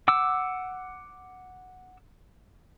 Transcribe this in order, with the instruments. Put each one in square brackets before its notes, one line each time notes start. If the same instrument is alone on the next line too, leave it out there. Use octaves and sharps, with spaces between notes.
[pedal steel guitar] F#5 D6 E6